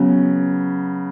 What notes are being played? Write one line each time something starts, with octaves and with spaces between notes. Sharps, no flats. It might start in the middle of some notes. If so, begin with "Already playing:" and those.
Already playing: C#3 F#3 B3